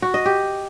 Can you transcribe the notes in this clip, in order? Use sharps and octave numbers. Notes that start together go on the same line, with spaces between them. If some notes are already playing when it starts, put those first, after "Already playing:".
F#4
D#5
G4